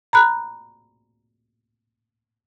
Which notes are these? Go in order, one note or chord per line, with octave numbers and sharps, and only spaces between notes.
A#5 B5 F#6